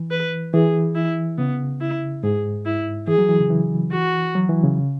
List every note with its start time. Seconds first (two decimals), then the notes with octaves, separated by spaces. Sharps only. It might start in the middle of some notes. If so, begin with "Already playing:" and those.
Already playing: E3
0.11 B4
0.53 E3 G#4
0.95 E4
1.38 C#3 B3
1.81 E4
2.23 G#2 G#4
2.66 E4
3.07 E3 G#4
3.18 F#3
3.29 E3
3.39 C#3
3.50 E3
3.92 F#4
4.35 F#3
4.49 E3
4.64 C#3